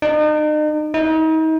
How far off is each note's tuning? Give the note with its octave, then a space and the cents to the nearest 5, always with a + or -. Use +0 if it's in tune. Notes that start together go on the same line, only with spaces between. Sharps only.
D#4 -40
D#4 +35